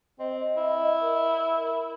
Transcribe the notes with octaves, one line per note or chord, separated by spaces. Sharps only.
C4 D#5
D#5
E4
A#4